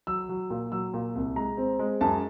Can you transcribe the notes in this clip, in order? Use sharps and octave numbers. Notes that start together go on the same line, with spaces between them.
F#3 E6
F#3
A#2
F#3 E6
A#2
C2
G#3 A#5
C4
G#3
F#2 A5